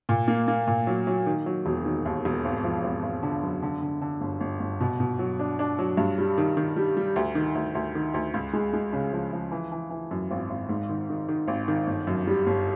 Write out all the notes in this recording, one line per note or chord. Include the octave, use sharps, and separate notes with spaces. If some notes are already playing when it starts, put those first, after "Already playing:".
A#2
A#3
A#3
A#2
F#3
F#3
D#3
F#3
E1
D#3
D#2
E1
G#1
F3
G#1
G#1
D3
F#2
D3
D3
D3
G1
G1
G1
B2
B2
F#3
D4
D4
F#3
G2
G3
D#3
D#3
G3
G3
D2
D#3
D2
D2
D#3
D2
C#2
G#3
G#3
C#3
F3
F3
E3
E3
E3
F#2
G#1
G#1
G#2
D#3
D#3
D#3
G#1
D#3
G1
F#2
G3
G1